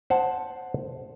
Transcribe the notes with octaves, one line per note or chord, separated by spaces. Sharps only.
C5 F#5 A5